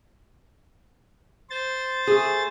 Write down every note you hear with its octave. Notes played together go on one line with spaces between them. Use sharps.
C5 A6
A3 G#4